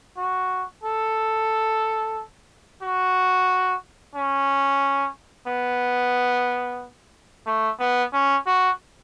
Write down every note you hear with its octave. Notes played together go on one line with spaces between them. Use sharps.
F#4
A4
F#4
C#4
B3
A3
B3
C#4
F#4